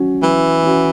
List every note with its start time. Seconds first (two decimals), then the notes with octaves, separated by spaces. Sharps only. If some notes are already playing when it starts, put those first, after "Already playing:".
Already playing: F#3 C#4 F#4
0.23 E3 F#3
0.63 C#4 F#4